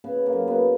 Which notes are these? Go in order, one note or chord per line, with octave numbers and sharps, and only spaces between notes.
C#3 B3
A#3
F#2
B3